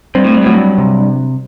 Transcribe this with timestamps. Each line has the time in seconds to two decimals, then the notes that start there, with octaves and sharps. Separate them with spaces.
0.15 G2 C4
0.24 A2
0.34 G2
0.43 A2 F#3
0.53 G2
0.78 C3